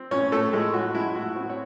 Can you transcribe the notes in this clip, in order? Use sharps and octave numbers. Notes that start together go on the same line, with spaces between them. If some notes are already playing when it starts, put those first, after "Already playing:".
Already playing: C4
A2 C#4 C#5
A2 A3 A4
A2 G#3 G#4
G#3 F#4
G#3 E4
A2 F#4
C4 F#4
C#5